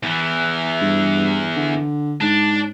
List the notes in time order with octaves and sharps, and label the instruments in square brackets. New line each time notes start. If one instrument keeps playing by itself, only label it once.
[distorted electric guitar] E2 E3
[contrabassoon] G2
D3
[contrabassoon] G#2 [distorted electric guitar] D4